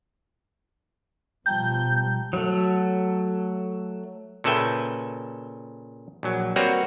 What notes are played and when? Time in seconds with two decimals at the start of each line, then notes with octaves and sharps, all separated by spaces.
1.46 B2 F3 G3 G5 A5 A#5 G6
2.33 F#3 A3
4.44 A#2 C#3 A4 B4 E5 G5
6.23 A#1 F#3
6.56 G3 A#3 C4 F#4 B4 C#5